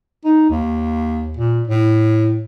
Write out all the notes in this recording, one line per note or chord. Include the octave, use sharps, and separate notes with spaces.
D#4
D#2
A#2
A2